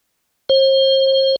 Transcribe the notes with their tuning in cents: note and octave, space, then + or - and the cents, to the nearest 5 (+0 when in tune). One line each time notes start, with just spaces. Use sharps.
C5 +40